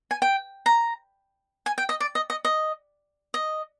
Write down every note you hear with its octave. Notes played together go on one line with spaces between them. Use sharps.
G#5
G5
A#5
G#5
G5
D#5
D5
D#5
D#5
D#5
D#5